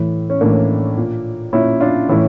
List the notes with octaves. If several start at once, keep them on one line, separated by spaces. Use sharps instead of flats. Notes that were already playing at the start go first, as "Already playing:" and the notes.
Already playing: A2 E3
C#4
A2 E3 A#3 D4
A#2
A#2 C#4 E4
D4 F4
A2 E3 C#4 E4